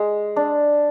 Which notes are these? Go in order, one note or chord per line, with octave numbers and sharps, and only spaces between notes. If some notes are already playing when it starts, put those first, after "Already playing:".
Already playing: G#3
D4